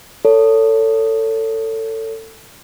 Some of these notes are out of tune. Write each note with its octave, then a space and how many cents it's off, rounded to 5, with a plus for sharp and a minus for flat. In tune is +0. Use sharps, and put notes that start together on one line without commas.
A4 +25 C#5 +25